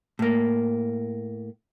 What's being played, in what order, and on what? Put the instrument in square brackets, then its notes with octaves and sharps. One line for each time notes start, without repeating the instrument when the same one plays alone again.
[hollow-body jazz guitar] A2 A#3